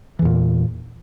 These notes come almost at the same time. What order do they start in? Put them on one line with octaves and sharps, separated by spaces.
E3 E2 A#2